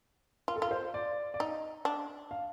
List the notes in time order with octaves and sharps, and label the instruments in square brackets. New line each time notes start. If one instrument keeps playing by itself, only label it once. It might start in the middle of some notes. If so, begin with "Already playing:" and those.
[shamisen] F4 [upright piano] A#4
[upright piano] A4
[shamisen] F4 [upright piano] A#4
[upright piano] C5
D5
D5
[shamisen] D#4 [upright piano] D#5
[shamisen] D4
[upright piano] F5